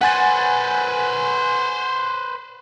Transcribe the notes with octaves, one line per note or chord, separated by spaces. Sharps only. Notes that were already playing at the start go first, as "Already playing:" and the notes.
B4 C5 F#5 G#5 A6